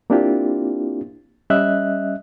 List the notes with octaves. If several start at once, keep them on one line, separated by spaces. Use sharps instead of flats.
A#3 C4 D4 E4 F4 G4
G3 C#4 D#5 E5 F#6